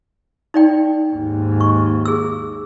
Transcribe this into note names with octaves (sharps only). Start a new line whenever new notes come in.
D#4 D5 G5
D#2 G#2
C#6
G#4 E6